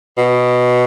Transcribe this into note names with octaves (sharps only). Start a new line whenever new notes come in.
B2